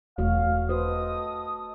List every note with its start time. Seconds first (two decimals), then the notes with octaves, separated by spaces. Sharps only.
0.18 E1 A3 F#4 C#5 F5
0.69 F#4 A4 B4 C5 D#5 D#6